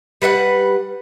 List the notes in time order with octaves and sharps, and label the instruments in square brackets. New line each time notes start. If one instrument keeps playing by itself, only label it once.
[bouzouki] G3 B4 E5 F#5